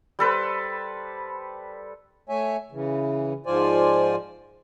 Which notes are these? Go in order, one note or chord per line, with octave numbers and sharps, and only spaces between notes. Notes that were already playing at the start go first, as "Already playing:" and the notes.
G3 A4 B4 C5
A3 C#5 E5 G#5
C#3 E3
G#2 F3 F4 C5 D5 G#5